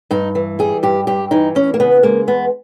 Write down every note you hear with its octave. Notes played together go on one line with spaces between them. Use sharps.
G2 D#4
E3
G3 G#4
G2 G4
G2 G4
E3 D#4
E2 C#4
A#3
C#3 B3
G#3 A#3
E2 B3